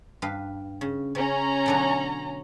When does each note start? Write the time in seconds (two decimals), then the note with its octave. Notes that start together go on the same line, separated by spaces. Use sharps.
0.22 G2 B4 F5
0.81 C#3
1.15 C#3 C#4 A#5
1.66 B2 D3 F#3